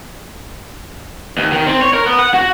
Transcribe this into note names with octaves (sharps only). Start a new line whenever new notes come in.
D#2
D#3
C4
C#5
A#4
B3
F#5
F#4